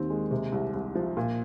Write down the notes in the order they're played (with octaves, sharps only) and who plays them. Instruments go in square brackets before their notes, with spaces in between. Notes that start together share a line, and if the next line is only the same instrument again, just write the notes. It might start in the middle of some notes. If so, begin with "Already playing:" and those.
Already playing: [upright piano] D#2 D#3 C4
G#3
C3
C2
C2
F3
A#2